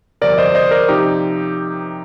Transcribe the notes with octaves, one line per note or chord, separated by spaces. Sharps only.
G1 F2 C3 A#4 D5
C5 D#5
C5 D#5
A#4 D5
C3 F3 D#4 G4